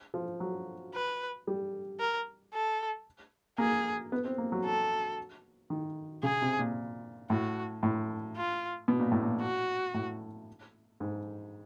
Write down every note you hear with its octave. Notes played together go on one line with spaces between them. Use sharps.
F3
F#3
B4
G3
A#4
A4
A#3 G#4
B3
C4
A#3
F#3
A4
D#3
C#3 G#4
C3
A#2
A2 F#4
A2
F4
B2
A#2
A2
A#2
F#4
A2
G#2